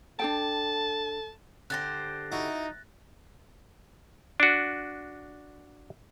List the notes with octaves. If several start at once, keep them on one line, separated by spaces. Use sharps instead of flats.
D4 G#4 A4 G5 A5
D3 G4 C5 F#6 A6 A#6
D#4 E4 F#4
D4 F#4